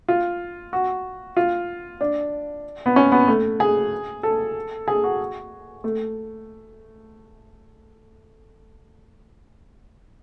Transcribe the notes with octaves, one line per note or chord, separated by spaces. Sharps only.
F4
F#4
F4
D4
B3
C#4
B3
A3
G#4
A4
G#4
F#4
A3